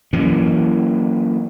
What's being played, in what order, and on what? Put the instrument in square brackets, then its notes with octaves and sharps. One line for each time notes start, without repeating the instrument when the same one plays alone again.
[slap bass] E3 F#3 A#3 C#4